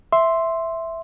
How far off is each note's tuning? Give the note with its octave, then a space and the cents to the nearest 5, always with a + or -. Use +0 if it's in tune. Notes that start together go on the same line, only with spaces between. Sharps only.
E5 +0 C6 +0